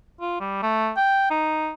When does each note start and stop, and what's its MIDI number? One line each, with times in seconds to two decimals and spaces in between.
0.21 0.38 65
0.40 0.60 55
0.63 0.91 57
0.97 1.26 79
1.31 1.71 63